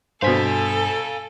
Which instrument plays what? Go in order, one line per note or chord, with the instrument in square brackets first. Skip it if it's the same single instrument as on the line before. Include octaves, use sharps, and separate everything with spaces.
[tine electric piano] G2 B6 [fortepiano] B2 C5 [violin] A4 [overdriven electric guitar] F5 G#5